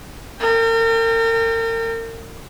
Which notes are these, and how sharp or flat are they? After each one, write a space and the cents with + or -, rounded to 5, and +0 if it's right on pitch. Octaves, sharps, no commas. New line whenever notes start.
A#4 -40 G5 +20